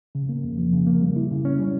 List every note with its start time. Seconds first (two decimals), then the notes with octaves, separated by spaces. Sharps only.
0.15 C#3
0.29 A#3
0.44 F2
0.58 F3
0.73 C#3
0.87 A#3
1.01 G3
1.16 E4
1.31 C#3
1.45 C#4
1.59 G3